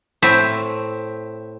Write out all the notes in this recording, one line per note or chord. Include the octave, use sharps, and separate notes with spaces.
A2 C4 E5